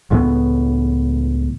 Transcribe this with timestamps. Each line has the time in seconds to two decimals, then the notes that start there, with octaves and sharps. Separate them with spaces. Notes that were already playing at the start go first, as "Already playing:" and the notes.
0.11 C#2 A2 E3 B3